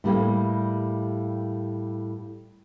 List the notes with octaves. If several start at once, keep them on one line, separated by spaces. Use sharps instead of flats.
A2 G3 A#3